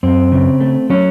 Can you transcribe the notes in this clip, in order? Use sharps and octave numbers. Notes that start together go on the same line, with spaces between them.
F#2 C4
C#3
A3
F#3 C#4